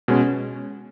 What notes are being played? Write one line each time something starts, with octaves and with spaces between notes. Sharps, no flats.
B2 G#3 C#4